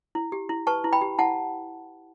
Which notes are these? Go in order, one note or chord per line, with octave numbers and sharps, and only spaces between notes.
E4
G4
E4
B4 A5 C#6
E4
G5 B5
G4
E4 F#5 A5